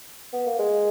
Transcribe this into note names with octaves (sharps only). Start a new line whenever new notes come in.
B3
A#3
G#3